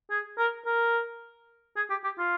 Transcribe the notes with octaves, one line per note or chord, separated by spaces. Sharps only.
G#4
A#4
A#4
G#4
G4
G4
F4